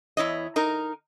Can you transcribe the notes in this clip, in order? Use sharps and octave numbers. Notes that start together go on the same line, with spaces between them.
E2 E4 C#5 D#5
D#4 A#4